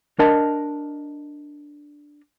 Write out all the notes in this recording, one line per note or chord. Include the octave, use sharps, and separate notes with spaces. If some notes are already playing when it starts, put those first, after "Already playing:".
D4 A#4 D#5 A5